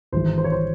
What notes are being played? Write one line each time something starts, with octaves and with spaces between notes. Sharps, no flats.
G#1 G#2 E3 C5
C5
C#5
C5